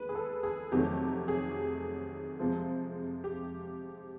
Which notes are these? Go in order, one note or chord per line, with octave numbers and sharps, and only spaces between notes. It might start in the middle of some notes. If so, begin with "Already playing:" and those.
Already playing: D#2 G#3 B4
G#4
A4
G#4
F2 C3 D#3 F#3 A3 G4
G#4
F2 C3 F3 G#3
G4